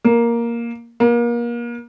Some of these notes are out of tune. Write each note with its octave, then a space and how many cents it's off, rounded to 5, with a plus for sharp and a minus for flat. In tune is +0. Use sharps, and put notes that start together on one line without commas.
A#3 +5
A#3 +30